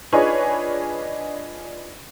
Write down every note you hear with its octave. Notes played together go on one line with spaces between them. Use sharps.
D4 D#4 F4 G#4 B4 C#5